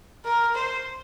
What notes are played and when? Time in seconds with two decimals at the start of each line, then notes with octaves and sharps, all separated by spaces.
0.25 A#4
0.55 C5